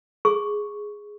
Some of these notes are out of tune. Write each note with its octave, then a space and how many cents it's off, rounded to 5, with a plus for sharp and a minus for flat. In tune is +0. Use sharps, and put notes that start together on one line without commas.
G#4 +0 C#6 +0